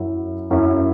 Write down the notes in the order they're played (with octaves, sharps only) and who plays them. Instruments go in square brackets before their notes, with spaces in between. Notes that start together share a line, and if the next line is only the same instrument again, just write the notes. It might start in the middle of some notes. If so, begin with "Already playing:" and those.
Already playing: [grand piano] F#2 F#3 C#4 E4
F#2 F#3 C#4 E4